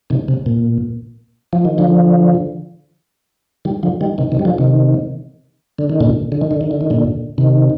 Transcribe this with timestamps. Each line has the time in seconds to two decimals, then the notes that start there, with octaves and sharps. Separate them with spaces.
0.10 C3 D#3
0.28 C3
0.46 A#2
1.53 F3
1.65 D#3
1.78 D3 F3
3.65 D#3 G3
3.83 D3 F3
4.01 D#3 G3
4.18 C3 D#3
4.32 C3 D#3
4.39 G3
4.45 D3 F3
4.58 C3 D#3
5.79 D3
5.90 D#3
6.01 A#2 D3
6.32 D3
6.41 D#3
6.51 D3
6.61 D#3
6.71 D3
6.81 D#3
6.90 A#2 D3
7.38 C3 D#3